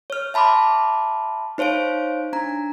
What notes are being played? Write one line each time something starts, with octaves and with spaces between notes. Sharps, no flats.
C#5 F6
E5 A5 B5 C6 D6 F6
D#4 C5 C#5 F5 D7
D4 A#5